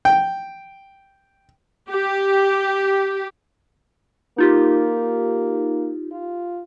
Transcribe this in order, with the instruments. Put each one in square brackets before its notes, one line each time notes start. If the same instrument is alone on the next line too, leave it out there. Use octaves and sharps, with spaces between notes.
[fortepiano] G5
[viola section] G4
[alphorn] A#3 [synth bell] D#4 F4 G4
[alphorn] F4